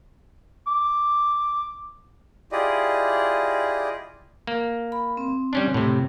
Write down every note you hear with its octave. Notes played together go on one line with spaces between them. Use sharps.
D6
E4 F4 G4 G#4 D5 D#5
A#3
B5
C4
G3 C#4 D4
A2 C3